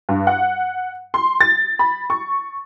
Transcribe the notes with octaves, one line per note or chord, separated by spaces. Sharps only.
G2
F#5
C6
A6
B5
C#6